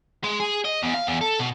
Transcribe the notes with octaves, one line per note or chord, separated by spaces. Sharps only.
G#3
G#4
D#5
E2
F5
E2
A4
B2